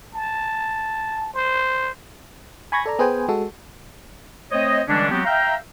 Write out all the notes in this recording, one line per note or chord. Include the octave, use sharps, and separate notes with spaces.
A5
C5
G#5 B5 C#6 G#6 A#6
A4 D5 A#5
B3 G#4 B4 C5 G5 G#5
G#3 F#4 A4
A3 C4 C5 C#5 D#5
D3 E3 G3 G#3 C#4 D4
F#3 G#3 B3 C4 F#4 G4
E5 F5 G5 A#5